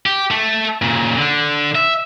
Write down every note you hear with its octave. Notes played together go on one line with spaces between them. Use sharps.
G4
A3
A#2 C#3
D3
E5